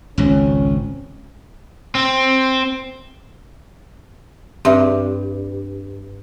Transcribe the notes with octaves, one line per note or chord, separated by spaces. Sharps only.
G#1 C#2 C4 C#4
C4
G2 C4 E5